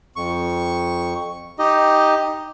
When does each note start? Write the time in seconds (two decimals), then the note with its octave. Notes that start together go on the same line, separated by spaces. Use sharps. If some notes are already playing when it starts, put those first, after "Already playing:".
0.16 F2 C#6
1.59 D#4 G4 D#5